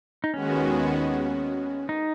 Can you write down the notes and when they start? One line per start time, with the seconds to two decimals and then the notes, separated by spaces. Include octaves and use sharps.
0.24 D#4
0.34 D#2 D#3 G#3 B3 C#4 F#4
1.89 D#4